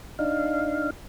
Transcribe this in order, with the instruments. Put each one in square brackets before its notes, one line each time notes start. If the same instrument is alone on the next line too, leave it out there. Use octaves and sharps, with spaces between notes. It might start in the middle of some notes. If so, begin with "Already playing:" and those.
[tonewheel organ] D4 D#4 F5